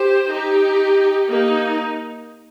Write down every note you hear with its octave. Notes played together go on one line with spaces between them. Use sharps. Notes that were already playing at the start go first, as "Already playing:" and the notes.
Already playing: G4 C5
D#4 G4
A#3 D#4